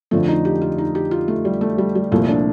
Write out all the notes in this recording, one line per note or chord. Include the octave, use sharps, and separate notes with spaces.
F2 D3 F3 A3
D#4
G4
F4
D#4
G4
F4
A3
G3
A3
G3
G3
C2 A#2 F3 A3
D4